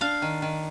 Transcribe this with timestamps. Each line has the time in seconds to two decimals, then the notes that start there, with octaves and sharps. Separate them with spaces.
0.01 D4 F5
0.22 D#3
0.42 D#3